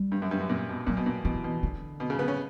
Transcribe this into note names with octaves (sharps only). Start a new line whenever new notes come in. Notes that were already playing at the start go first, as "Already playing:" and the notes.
Already playing: G3
G2
F#2
G2
F#2
A#2
B2
A#2 F#3
B2
A#2
B2 E3
B2
D3
B2
C#3
B3
C#4